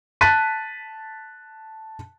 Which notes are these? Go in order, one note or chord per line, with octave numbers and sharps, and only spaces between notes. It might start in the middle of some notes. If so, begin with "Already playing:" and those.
A5 F#6 A6 B6 D#7